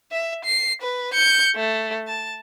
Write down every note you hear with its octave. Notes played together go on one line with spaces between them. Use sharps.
E5
C7
B4
G6 C#7
A3
A5